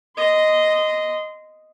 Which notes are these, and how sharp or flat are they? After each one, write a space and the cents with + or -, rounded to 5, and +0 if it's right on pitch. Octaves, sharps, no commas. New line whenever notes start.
D#5 +0 C6 -20